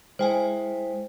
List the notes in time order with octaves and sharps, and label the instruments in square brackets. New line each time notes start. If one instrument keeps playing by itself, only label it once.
[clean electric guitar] G#3 E4 [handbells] C5 G5 G#5